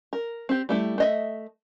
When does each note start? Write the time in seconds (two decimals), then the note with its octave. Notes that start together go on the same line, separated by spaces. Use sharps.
0.13 A#4
0.49 C4 G4
0.69 G3 A3 E4
0.98 A3 D#5 E5